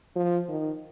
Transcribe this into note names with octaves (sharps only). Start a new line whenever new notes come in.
F3
D#3